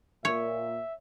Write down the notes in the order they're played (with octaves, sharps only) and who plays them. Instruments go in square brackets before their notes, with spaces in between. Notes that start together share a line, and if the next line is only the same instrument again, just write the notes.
[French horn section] A#2 A#3 A#4 [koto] C#5 [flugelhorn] E5